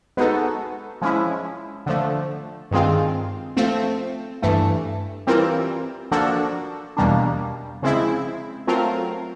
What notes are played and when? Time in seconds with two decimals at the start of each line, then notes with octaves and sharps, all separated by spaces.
0.17 G#3 B3 D#4 F#4 A4
1.01 F3 G#3 C#4 E4
1.86 D3 F3 A3
2.71 G2 D#3 G#3 C4 F4
3.57 F3 A3 C4
4.42 G2 E3 A3
5.27 E3 G3 C4 F4 A#4
6.12 F3 A#3 D4 F#4 A4
6.97 E2 B2 G3 A#3 D4
7.82 C#3 F3 G#3 C4 E4
8.67 F#3 A3 C4 F4 A#4